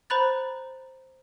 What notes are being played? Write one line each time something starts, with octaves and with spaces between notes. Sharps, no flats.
C5 A#5 B5 F#6 A6